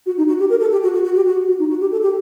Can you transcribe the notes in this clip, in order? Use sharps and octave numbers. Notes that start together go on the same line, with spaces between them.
F#4
D#4
F#4
G4
A#4
A4
G4
F#4
F#4
F#4
G4
F#4
F#4
D#4
F#4
G4
A4
G4